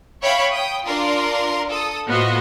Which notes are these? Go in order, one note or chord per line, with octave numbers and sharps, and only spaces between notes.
C#5 E5 F5 G5 B5 C#6
G5 D#6
D4 F4 A#4 C6
A4 D#6
A2 B3 F4 F#4 C5 D#5